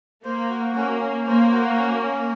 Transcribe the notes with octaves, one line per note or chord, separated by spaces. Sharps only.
A#3 C5
F#4
A#3 C#4
C#4
A#3 C5
F#4
C#4
C#4